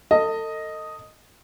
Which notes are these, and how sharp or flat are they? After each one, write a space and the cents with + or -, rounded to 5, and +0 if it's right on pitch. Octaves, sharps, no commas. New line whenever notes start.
A4 +35 D#5 +0